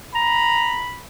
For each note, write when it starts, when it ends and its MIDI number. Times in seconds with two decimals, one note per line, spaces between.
0.15 0.85 82
0.15 1.07 83